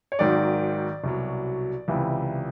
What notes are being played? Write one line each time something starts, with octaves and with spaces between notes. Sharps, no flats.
C#5
G#1 G#2 D#3 F#3 D5
C2 B2 F#3
C#2 C3 E3